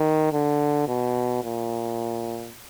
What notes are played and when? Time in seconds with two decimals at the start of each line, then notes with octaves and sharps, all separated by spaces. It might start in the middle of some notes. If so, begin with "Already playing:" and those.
Already playing: D#3
0.33 D3
0.88 B2
1.44 A#2